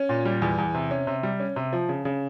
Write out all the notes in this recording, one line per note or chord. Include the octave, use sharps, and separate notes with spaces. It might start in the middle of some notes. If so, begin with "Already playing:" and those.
Already playing: C#4
A#2
G3
E2
E2
C3
C#4
C3
G3
C#4
C3
F3
C#3
C#3